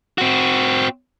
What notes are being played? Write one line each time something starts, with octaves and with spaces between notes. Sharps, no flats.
C4 F#4